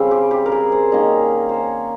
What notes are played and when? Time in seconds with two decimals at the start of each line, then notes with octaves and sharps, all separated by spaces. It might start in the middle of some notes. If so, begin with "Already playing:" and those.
Already playing: C#3 G3 C4
0.11 G4
0.31 G4
0.46 A#4
0.52 G#4
0.72 C5
0.92 D#3 A#3 C#4 D#5
1.49 C5 C#5